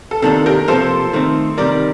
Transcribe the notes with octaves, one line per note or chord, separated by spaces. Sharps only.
A4
C3 D#3 A#3 D4 A4
G4 A#4
C3 F3 A#3 A4 C5
D#3 A3 C4
C2 C3 D#3 G3 A#4 D5